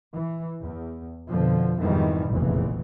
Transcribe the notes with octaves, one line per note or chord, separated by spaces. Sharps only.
E3
E2
F2 B2 D3 F3
F2 G#2 B2 D#3 E3 G3
F1 A#1 E2 A#2 C#3 E3